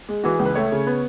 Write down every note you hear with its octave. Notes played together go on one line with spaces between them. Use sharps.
G#3
E3 F#4
G#4
C#2
B4
A3 C#5
C#3
B3